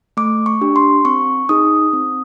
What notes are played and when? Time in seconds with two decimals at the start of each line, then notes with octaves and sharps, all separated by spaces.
0.17 A3 D6
0.46 C#6
0.61 D4 G4
0.76 C6
1.05 C4 C#6
1.49 D#4 G#4 D#6
1.93 C4